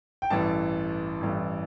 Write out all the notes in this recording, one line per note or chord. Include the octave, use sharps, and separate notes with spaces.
G5
A1 G2 E3 A5
A1 G2 E3